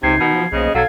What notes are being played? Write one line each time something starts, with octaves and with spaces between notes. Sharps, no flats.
C#2 C3 D#4 G#6 C7
B2 D#3
F3
B1 C#3 A#3 C5 D#5
B1 F#3 A4 F5 G#6